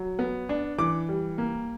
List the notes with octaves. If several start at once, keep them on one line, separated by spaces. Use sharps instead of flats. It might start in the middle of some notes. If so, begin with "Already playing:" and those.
Already playing: F#3
B3
D4
E3 D6
G3
A#3